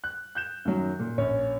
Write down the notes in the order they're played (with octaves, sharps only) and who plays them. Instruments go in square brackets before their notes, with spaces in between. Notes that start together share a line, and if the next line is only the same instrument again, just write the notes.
[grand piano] F#6
F#6 G6 E7
F#2 D#3 F#3
A#2
A#1 C#4 C#5